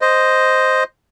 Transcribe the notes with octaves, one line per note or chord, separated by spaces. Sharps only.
C5 D#5